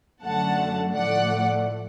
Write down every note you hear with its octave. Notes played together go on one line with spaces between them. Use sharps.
F#2 D3 F#3 A3 F#5 A5
A2 F3 A3 D5 F#5